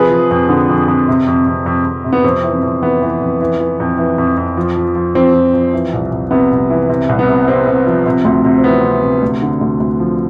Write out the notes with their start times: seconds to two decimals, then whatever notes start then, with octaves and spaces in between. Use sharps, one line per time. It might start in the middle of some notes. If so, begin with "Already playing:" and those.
Already playing: C3 F3 G#4 B4
0.11 F3
0.31 F2
0.49 D3
0.69 F2
0.88 F2
1.08 C3
1.27 F2
1.46 F2
1.66 F2
1.85 F2
2.04 C3
2.13 B3
2.24 F2 C4
2.44 E3
2.53 C4
2.63 F2
2.82 E3 B3
3.02 E3
3.21 F2
3.41 E3
3.60 E3
3.80 F2
3.98 E3
4.18 F2
4.37 F2
4.57 F3
4.76 F3
4.95 F3
5.15 F3 C4
5.34 F3
5.54 F3
5.73 E3
5.93 C2
6.11 C2
6.31 C3 B3
6.51 C2
6.70 E3
6.89 C3
7.09 C2
7.19 B3
7.28 C3
7.48 C3 C4
7.67 C3
7.87 F3
8.06 C3
8.25 D2
8.45 C3
8.58 C4
8.63 E3 B3
8.84 C3
9.03 C3
9.22 D2
9.42 D3
9.61 D2
9.80 D2
10.00 F3